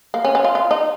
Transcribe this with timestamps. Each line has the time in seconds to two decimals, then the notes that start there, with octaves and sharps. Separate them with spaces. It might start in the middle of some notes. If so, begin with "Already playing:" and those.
0.14 A#3
0.25 C#4
0.35 C#4
0.44 F4
0.55 F4
0.71 D#4